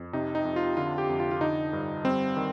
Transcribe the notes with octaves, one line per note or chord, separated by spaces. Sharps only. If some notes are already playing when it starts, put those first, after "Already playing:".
Already playing: F2
C3 D#4
D#4
F2
F4
D3 F4
G4
F2
F4
F4
D3 D#4
G2
G3 C4
D#3